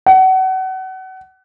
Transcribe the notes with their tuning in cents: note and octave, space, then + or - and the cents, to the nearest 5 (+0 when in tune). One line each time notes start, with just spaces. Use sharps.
F#5 +30